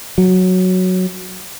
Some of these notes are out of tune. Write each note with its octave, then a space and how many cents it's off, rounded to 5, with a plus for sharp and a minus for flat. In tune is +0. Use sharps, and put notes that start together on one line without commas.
F#3 -5